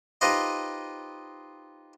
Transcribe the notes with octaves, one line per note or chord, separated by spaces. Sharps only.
D#4 F4 G4 B4 C5 D#5